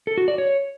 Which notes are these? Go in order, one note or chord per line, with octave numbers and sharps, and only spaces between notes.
A4
F#4
D5
C#5